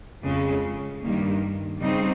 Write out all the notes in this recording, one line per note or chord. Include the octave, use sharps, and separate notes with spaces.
F2 C#3 G#3
G2 D#3 G3 A#3
C#3 G3 C4 D#4